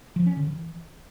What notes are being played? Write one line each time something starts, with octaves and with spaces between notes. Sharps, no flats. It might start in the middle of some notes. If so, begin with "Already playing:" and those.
F3
C#4
D3
E3